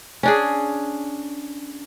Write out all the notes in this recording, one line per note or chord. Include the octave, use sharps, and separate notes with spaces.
C#4 D4 G#4